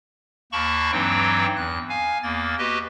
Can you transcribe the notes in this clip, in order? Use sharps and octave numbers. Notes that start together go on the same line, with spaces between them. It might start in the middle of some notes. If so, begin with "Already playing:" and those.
D#2 A#3 A5 B5 C#6
G2 E3 F#3 C4 D#4 G5
E2 F#6
F5 G#5
E2 A#3 A6
F#4 G4 B4 D#5